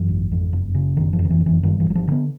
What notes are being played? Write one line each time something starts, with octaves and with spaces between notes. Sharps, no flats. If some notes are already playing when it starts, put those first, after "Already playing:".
Already playing: F#2 E3
G#1
F2
F#1
C#3
F#1 D#3
F3
F2
D#3
E3
F#1
E3
G2 D#3
E3
G1 F#3
F3
D3 B3